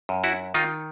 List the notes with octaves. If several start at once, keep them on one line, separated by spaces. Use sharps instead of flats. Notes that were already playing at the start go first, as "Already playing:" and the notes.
F#2
E4 F#4
D#3 D#4 F4